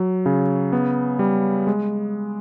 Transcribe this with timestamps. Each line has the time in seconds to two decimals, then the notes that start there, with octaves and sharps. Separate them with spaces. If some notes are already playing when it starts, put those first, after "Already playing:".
Already playing: F#3
0.26 C#3
0.72 B3
1.19 G3
1.67 G#3